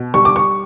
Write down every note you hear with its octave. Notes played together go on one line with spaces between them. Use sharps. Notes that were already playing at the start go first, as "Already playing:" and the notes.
Already playing: B2
G3 C#6
D6
C#6